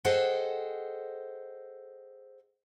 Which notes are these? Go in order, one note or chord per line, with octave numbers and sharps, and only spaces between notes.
G#4 A4 C5 D#5 F#5 G5